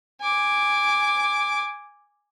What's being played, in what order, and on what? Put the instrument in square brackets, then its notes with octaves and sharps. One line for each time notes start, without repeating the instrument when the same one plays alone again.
[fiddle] G#5 D6